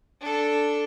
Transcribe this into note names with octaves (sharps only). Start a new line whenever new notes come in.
D4 A4